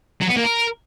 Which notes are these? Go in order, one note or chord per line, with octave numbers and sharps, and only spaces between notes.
F#3
B3
A#3
A#4